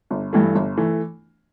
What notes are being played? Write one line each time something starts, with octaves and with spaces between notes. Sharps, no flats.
G1
G2 E3 A3
G1
E3 A3